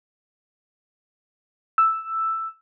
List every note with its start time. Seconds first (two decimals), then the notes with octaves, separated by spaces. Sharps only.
1.78 E6